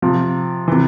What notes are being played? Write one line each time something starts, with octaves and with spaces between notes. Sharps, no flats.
C3 F3
C3 E3